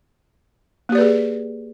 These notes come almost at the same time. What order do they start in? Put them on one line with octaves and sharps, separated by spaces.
A#3 G4 D5 B4 G#4